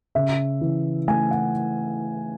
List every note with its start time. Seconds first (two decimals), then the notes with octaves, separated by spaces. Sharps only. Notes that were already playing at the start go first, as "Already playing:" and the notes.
0.15 C#3 E5
0.61 E3
1.07 A3 G#5
1.31 F#5